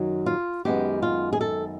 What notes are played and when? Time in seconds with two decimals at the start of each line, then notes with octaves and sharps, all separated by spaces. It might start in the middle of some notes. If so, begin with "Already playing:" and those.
Already playing: F#2 D#3 F#3
0.26 F4
0.65 F#2 D#3 G#3 B3 G4
1.02 F4
1.33 G#4
1.41 A4